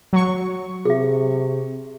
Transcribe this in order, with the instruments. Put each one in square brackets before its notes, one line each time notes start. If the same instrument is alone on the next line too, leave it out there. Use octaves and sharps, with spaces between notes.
[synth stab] F#3 C#6
[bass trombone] C3 [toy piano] G#4 E5